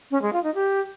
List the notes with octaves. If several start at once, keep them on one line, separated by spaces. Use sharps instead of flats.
C#4
G#3
F4
D#4
G4